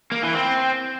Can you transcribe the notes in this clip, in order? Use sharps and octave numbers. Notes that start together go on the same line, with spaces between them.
A#3
E3
C4